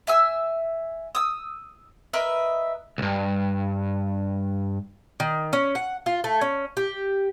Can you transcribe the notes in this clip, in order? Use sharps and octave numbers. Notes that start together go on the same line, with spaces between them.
E5 G#5 E6
D#6 E6
A#4 B4 D#5 E5
C2 G2
D#3
C#4
F#5
F4
A3
C#4
G4